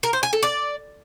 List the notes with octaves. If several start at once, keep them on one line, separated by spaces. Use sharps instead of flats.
A#4
C5
G#5
A4
D5